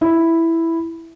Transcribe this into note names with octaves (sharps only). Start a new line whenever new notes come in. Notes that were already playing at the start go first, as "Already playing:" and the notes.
E4